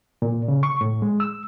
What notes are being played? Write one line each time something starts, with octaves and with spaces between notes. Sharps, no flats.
A#2
C#3
C#6
A2
G#3
E6